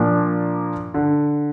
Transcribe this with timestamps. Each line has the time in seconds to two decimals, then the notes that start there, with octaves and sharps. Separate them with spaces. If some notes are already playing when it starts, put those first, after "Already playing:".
Already playing: A#2 F3 A#3 D4
0.94 D3